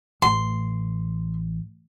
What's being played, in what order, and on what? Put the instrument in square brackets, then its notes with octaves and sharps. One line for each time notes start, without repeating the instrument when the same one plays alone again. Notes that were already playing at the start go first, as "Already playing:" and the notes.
[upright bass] A1 [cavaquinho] C6